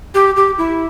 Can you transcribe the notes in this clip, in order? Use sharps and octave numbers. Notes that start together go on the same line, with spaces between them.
G4
G4
E4